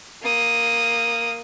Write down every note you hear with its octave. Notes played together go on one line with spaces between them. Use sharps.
A#3 D#6